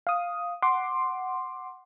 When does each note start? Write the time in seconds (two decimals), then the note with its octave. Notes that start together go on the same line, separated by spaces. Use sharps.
0.07 F5 D#6
0.62 F#5 C6 D6